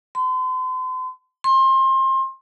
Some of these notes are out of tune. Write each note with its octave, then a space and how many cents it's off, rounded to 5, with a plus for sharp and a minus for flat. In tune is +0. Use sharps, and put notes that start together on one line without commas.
C6 -40
C6 +25